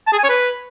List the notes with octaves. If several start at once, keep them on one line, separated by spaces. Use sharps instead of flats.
A5
G#4
G#5
C#5
B4